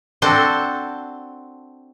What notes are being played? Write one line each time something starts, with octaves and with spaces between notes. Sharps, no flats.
C4 D4 F#4 A4 C5 A5